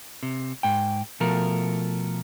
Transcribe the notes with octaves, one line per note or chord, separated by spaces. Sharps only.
C3
G#2 G5
B2 F3 A3 A#4